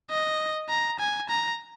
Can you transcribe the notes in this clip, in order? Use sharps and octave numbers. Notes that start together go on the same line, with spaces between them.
D#5
A#5
G#5
A#5